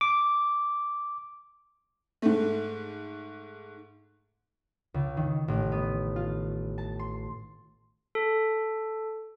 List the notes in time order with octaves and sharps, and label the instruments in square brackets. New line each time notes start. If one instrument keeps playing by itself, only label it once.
[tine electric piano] D6
[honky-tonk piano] G#2 A3
[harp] C#2
D#3
A1
B3
F4
A5
C6
[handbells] A4